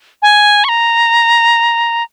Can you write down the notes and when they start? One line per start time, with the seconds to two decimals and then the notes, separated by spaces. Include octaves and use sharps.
0.22 G#5
0.64 C#6
0.69 A#5